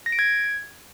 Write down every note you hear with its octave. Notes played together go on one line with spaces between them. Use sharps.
A#6
D7
G#6